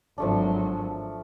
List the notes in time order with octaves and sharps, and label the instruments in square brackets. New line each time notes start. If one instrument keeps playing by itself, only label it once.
[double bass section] G#1 F#3 [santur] F3 A3 D4